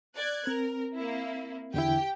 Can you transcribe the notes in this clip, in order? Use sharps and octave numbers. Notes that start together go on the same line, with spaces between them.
D5 F#6 G#6
C4 A#4
A#3 E4
E2 D3 E4 G4 G5